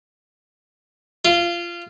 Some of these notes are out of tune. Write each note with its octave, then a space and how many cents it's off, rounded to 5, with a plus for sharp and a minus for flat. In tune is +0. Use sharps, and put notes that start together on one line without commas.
F4 -20